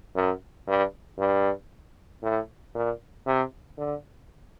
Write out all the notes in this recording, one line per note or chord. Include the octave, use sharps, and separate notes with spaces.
F#2
G2
G2
A2
A#2
C3
D3